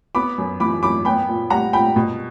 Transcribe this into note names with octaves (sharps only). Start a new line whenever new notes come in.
B3 B5 D6
F#2
E3 B5 D6
F#2 B5 D6
B3 G5 B5
A#2
G3 F#5 A#5
A#2 G5 B5
B2